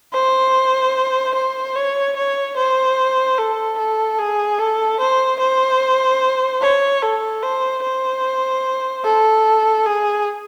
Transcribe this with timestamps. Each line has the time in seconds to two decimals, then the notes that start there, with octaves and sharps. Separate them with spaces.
0.13 C5
1.35 C5
1.76 C#5
2.16 C#5
2.56 C5
3.38 A4
3.78 A4
4.19 G#4
4.59 A4
5.00 C5
5.40 C5
6.62 C#5
7.02 A4
7.43 C5
7.83 C5
9.05 A4
9.86 G#4